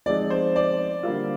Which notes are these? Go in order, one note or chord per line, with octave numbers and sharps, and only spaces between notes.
F3 G#3 C4 D#4 D5
C5
D5
D3 G3 A#3 F4